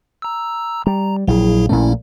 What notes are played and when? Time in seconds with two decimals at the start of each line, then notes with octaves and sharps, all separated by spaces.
0.22 A#5 E6
0.87 G3 A#5
1.28 A#1 F#3 E4 G#4
1.69 A#1 A#2 A3 C#4 E4